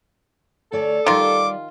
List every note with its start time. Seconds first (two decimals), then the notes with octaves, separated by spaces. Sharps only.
0.72 D2 A4 C#5 D5
1.06 D#3 G3 F4 D5 E5 D6